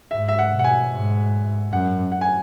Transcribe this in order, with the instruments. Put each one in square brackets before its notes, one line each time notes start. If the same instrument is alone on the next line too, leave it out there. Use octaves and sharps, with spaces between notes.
[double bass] G#2 [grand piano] E5
[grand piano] E5
F#5
[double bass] B2
[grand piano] F#5
G#5
[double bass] G#2
[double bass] F#2 [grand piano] F#5
[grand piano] F#5
G#5